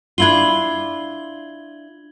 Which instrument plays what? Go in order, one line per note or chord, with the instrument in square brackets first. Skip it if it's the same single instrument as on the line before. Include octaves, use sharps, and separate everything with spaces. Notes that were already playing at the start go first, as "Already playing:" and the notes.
[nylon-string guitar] D4 E4 F4 [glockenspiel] G#6 F#7 G7